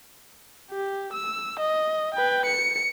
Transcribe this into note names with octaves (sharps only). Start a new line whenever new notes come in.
G4
E6
D#5
B4 G5
C#7